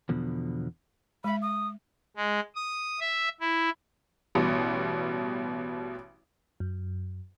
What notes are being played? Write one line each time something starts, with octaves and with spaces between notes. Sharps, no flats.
E2 B2 D3 F3
G#3 E5 B5
D#6
G#3
D#6
E5
E4
A1 B2 G3
F#2